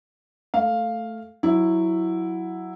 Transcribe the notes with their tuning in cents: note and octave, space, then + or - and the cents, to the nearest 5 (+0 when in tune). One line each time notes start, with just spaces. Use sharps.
A3 +5 F5 +0
F#3 -5 E4 +0